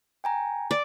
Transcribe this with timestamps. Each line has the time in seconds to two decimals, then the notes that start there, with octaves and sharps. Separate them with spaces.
0.24 G5 G#5 A#5
0.71 D5